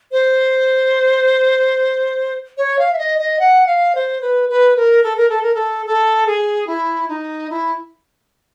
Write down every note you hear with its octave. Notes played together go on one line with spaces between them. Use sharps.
C5
C#5
F5
E5
D#5
D#5
F#5
F5
C5
B4
B4
A#4
A4
A#4
A4
A#4
A4
A4
G#4
E4
D#4
E4